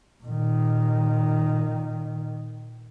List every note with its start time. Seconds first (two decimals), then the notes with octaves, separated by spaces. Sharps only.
0.24 A#2 D#3